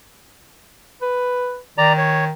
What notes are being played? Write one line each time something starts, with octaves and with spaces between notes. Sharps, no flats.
B4
D#3 D5 A#5
C#5